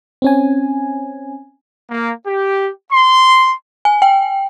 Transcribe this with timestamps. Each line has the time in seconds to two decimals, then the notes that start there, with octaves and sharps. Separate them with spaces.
0.22 C4 C#4 G#5
1.90 A#3
2.26 G4
2.91 C6
3.85 G#5
4.02 G5